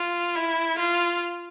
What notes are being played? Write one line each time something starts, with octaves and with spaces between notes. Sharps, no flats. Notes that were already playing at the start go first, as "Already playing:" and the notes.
Already playing: F4
E4
F4